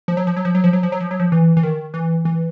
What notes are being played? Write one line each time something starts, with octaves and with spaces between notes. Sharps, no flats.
F3
F#3
F3
F#3
F3
F#3
F3
F#3
F3
F#3
F3
F#3
F3
E3
E3
D#3
E3
E3